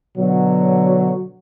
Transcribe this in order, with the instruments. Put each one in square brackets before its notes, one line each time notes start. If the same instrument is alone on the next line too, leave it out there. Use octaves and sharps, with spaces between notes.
[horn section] B2 D3 F#3